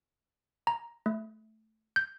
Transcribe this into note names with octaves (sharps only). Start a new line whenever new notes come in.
A#5
A3
G6